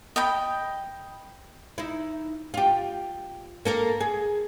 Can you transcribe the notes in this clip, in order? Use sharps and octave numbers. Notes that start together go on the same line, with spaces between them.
D#5 G5 B5
D#4 E4
F4 G4
A#3 A4 A#4
G#4